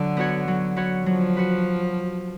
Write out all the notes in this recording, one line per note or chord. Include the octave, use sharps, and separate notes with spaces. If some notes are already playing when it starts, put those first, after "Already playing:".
Already playing: D3 F#3 D4
B3 F#4 C#5
F#3
B3 F#4 C#5
F3 F#3
F#4 B4